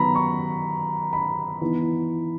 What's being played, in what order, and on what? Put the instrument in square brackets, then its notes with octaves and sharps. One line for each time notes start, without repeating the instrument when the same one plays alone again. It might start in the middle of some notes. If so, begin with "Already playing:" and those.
Already playing: [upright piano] D#3 F#3 B3 A#5 B5
C#6
B5
E3 B3 D#4